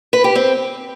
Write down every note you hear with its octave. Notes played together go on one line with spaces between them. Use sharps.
B4
G4
C4